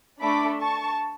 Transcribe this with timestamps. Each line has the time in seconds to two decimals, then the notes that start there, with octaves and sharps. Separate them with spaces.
0.21 A3 D4 A4 B5 D6
0.60 A5 C#6